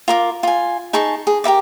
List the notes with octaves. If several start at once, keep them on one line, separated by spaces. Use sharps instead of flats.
F4 A#4 D6
F4 G#5
D#4 G#4 A5 C#6
G#4
G4 A#4 E5 D6